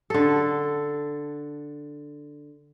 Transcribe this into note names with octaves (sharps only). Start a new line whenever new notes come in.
D3 A4